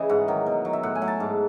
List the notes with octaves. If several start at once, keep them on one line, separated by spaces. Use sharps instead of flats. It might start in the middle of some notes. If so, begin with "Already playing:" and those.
Already playing: C#3 E3 D#5
G#2 F#5
D#3 F#3
B2
F#3
E5
A2 F#5
G#5
F#3
A5
G#2